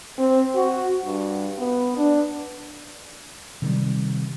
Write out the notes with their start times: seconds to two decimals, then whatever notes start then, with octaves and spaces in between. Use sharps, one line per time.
0.19 C4
0.55 F#4
1.05 G2
1.58 B3
1.97 D4
3.62 C3 D#3 F#3 G3